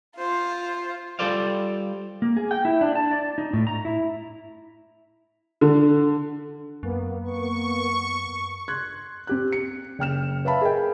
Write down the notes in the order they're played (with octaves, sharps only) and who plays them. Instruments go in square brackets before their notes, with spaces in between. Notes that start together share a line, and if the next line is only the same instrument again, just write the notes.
[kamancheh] F4 C5
[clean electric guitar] G3 F4 A4 C5 D5 F5
[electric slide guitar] A#3
G#4
G5
E4
D4
A5
D5
D#4
A2
A#5
E4
[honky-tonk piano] D3
[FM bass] F#2 [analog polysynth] A#3 B3
[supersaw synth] C#6
[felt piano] C6 F#6 G#6
C4 G4 F#6
C#7
F#1 G5 F6 E7
B4 C#5 E5 F5 A5 B5
G#4 A#4 D#5 G5